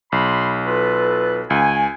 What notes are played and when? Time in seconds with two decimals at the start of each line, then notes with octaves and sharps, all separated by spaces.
0.12 B1 B5 C6
0.66 F4 A4 B4
1.50 C#2 G#5